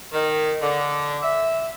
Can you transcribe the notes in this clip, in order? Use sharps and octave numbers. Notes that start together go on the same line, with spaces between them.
D#3
D3
E5